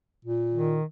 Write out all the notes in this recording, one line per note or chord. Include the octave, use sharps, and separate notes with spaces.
A#2
D#3